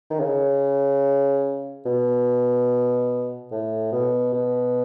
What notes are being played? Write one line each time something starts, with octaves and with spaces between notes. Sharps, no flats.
D#3
C#3
B2
A2
B2
B2